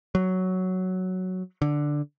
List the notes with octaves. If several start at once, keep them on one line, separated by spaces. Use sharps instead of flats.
F#3
D3